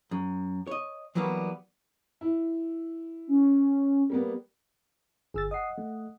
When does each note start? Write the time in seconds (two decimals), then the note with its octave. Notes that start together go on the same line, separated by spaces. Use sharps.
0.11 F#2
0.67 C#5 D#5
1.15 E3 F#3 G3 A#3 B3
2.21 E4
3.27 C#4
4.10 G3 A#3 B3
5.34 G1 G#4 E6 A6
5.51 D#5 F#5 D#6 C7
5.78 A3